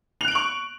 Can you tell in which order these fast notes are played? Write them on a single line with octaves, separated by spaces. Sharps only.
F7 F#6 D7 F#7 C#6